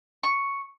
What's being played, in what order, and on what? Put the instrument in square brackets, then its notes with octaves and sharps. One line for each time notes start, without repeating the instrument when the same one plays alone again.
[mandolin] C#6